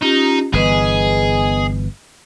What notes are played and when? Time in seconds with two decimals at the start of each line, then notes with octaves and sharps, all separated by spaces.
0.02 C#4 D#4 F4 G4
0.53 G1 E3 B3 G#4 B4 D#5